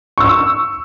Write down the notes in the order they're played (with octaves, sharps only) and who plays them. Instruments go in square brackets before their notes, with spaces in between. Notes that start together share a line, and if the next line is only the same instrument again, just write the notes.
[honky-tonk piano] C#6 E6